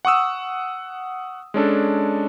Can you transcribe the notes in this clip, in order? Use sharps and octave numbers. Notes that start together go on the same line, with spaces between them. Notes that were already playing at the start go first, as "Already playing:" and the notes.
F#5 C#6 D#6 E6
G#3 C#4 D4 A4